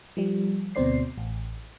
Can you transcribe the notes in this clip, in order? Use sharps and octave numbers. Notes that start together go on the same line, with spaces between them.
F3 G3
D2 B2 C4 C5 D5 C7
A1